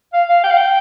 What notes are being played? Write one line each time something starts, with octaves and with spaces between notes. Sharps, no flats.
F5
F5
G5
F5
G5